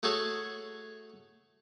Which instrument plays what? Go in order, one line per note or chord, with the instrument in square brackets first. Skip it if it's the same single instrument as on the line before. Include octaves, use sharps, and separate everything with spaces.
[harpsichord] A3 F#4 G#4 A4 C#5